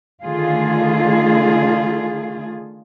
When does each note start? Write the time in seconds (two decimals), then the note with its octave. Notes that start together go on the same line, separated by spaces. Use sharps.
0.24 D3 D#3 A3 F4 G#4